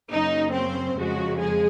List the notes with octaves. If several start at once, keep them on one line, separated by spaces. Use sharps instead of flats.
F#2 C#3 F#3 A#3 C#4 D#4
C4 C5
F2 C#3 F3 F#3 G#3 F#4
G#3 G#4